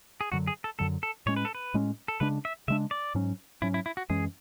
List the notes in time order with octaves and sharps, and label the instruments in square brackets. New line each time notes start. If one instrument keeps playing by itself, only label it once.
[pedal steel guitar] G#4
[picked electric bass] F#2 D3 F#3 [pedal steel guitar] F#4
[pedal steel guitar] G#4
A4
[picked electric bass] F#2 D3 F#3 [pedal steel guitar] A4
[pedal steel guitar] A4
[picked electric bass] A2 G#3 C#4 [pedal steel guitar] C#5
[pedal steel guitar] B4
A4
B4
[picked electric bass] A2 G#3 C#4
[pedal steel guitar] A4
[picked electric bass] C#3 G#3 D4 [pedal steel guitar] B4
[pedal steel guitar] E5
[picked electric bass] C#3 G#3 D4 [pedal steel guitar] E5
[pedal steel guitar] D5
[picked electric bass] G#2 F#3 C#4
[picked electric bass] G#2 F#3 C#4 [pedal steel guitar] E4
[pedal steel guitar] E4
E4
F#4
[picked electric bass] F#2 E3 G#3 C#4 [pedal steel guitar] G#4